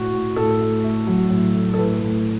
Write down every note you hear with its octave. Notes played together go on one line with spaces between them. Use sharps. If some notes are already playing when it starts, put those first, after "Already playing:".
Already playing: A2 F#4
A2
A2 A4
A3
A3
F#3
A2
A3
A4
A2 B4
A2